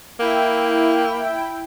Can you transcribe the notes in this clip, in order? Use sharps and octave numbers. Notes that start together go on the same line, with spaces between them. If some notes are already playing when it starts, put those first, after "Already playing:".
A#3 E4 G5